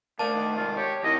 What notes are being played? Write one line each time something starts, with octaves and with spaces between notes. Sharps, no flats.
D2 A3 A#3 D5 A5
D#3
C3 G#3 F4
G4 C#5
D#3 C4 E4 D#5